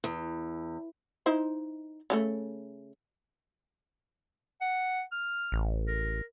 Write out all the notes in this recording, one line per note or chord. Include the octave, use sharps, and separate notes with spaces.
E2
D#4 E4 C5
C#3 F#3 A3
F#5
F6
A1
A#4